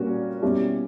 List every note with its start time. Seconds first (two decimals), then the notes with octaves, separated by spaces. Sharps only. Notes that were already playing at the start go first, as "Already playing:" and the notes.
Already playing: A#2 G3 C#4 F#4 A#4
0.42 B2 G3 C#4 E4 G4